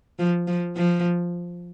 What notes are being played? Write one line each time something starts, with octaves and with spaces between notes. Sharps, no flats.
F3
F3
F3